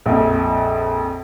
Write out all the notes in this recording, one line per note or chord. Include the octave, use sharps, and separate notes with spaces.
A#1 F2